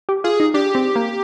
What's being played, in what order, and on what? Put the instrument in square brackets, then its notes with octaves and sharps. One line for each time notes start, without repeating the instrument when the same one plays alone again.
[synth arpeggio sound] G4
[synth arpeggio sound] F4 [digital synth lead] G#4
[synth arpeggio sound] D#4
[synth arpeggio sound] D4 [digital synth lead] G4
[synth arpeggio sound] C4
A#3